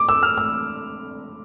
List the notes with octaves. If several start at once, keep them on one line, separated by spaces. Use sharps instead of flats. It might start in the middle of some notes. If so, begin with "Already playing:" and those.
Already playing: D6
E6
F6
E6